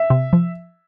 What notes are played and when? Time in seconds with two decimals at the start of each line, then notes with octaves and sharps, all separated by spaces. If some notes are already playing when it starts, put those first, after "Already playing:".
Already playing: E5
0.10 C3
0.33 F3